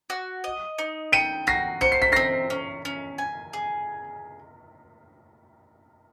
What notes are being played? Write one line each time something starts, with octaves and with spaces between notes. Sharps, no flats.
F#4
D#5
D#4
G5 C#7 D#7
F#4 A#6 C7
C5 C#7
C7
B6
C4 A#6 C7
C#4
C#4
G#5
G#4